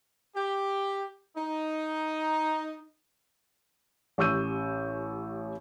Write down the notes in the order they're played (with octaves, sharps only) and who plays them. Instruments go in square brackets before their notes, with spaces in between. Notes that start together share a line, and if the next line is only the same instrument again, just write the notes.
[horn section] G4
D#4
[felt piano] A1 G4 C#6 E6 G6 D#7